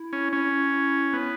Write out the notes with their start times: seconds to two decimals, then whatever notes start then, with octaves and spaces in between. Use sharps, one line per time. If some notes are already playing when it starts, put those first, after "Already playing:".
Already playing: E4
0.13 C#4
0.33 C#4
1.13 B3